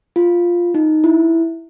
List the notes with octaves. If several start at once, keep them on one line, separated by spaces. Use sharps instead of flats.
F4
D#4
E4